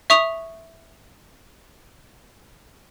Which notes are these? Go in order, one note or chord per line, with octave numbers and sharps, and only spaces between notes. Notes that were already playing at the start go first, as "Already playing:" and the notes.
E5 C#6 D#6 F7